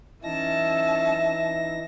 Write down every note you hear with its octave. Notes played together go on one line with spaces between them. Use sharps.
E3 C#4 D#4 E5 A5 A#6